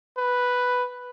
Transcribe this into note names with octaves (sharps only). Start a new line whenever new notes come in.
B4